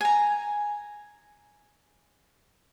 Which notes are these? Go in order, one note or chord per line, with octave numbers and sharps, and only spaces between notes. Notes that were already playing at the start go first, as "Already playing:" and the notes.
G#5 A#5